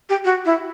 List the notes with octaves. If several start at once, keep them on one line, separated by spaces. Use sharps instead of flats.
G4
F#4
E4